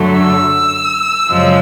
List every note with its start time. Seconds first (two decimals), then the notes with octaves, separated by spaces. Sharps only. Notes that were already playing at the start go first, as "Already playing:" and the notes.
Already playing: F#2 D3 F#3 A3
0.19 E6
1.28 F#2 C#3 F3 G#3